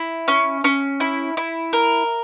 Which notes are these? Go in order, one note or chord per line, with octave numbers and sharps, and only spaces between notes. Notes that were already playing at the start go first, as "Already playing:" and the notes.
Already playing: E4
C#4
C#4
E4
E4
A#4